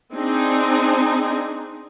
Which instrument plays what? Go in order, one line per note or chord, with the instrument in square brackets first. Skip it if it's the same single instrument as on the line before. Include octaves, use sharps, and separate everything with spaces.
[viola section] C4 D4 D#4 G#4